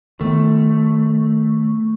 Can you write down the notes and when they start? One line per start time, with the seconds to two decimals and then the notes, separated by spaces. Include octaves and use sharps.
0.21 D#3 A3 B3